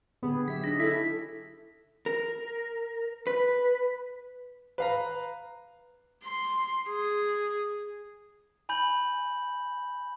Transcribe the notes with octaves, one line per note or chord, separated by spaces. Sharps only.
D3 B3 G4 G#4
F#3 G4 E5 B6
D4 D#4 G#4 A#6
E4 A4 B6
A#4
B4
B4 F5 A#5
C6
G#4
G#5 B5 G6 F#7